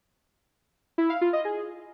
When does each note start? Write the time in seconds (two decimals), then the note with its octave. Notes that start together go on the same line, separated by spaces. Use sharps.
0.98 E4
1.10 F5
1.21 F4
1.33 D#5
1.45 G#4